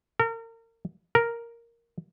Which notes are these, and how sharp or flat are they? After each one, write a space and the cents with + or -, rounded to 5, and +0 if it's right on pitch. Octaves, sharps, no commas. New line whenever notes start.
A#4 -35
A#4 +0